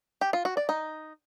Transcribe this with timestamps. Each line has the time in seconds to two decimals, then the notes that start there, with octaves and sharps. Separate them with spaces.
0.21 G4
0.33 F4
0.45 F#4
0.57 D5
0.69 D#4